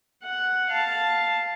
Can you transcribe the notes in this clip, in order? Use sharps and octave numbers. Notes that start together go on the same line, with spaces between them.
F#5
F5 A5